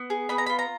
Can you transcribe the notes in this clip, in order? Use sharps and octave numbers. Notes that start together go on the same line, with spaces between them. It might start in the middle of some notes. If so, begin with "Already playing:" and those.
Already playing: B3
G#4
B3 B5
A#5
F4 B5
A#5